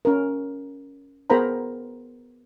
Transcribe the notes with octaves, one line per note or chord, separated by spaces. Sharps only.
C#4 A#4
B3 G#4 A#4 C5 A#5 B5